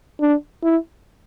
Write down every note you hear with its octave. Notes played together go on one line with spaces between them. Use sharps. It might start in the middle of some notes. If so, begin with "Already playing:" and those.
D4
E4